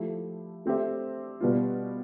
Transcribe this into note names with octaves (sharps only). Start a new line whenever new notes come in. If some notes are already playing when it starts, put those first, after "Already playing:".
Already playing: F3 A3 E4 G4
A3 C4 G4 C5 E5
B2 G3 B3 F4